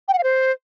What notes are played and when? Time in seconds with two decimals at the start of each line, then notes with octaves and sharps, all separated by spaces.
0.08 G5
0.13 F#5
0.18 F5
0.23 C5